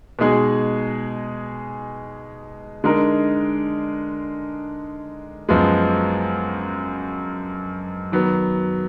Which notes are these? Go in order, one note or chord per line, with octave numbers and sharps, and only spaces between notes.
B2 G#3 D#4 G#4
D3 G#3 D#4 A#4
F#2 F3 G#3 B3
D#3 F#3 B3